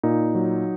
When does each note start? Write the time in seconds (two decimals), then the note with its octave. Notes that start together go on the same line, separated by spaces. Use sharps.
0.03 A#2 D#4
0.35 F#3